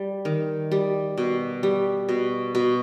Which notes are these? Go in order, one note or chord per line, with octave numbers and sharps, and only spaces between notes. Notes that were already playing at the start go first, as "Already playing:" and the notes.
Already playing: G3
D#3
G3
B2
G3
B2
B2